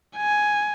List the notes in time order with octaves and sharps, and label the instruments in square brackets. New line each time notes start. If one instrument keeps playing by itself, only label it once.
[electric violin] G#5